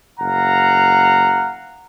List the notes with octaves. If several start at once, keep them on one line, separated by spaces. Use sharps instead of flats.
F#1 F5 F#5 A#5